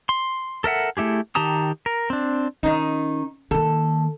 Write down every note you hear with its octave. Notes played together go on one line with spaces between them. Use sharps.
C6
A4 A#4 E5 F#5
A3 E4 G4 G#4
D#3 G4 A5 A#5 D#6
A#4
C4 D4
D#3 C#4 D#4
D#3 A#3 A4